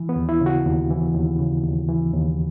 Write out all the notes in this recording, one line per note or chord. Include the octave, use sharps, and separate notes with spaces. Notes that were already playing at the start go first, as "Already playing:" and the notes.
Already playing: E3
B3
D#2
E4
C#3
F#4
D#2
E3
D#2
C#3
D#2
E3
D#2